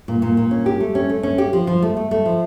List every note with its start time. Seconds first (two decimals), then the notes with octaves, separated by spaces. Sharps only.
0.08 A#2
0.22 A#2
0.37 A#2
0.51 C#4
0.66 G4
0.80 A3
0.95 C#4
1.10 A3
1.23 C#4
1.38 G4
1.53 F3
1.67 F3
1.82 A3
1.97 A3
2.11 A3
2.26 F3